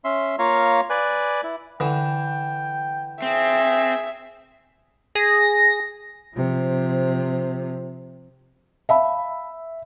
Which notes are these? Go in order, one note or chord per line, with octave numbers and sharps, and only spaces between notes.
C#4 E5 C6
A#3 F4 C#5 F5 A#5
B4 D5 G#5 F#6
E4
D3 E3 G5
C4 G#4 E5
G#4 A#6
C3 F3
E5 F5 A5 B5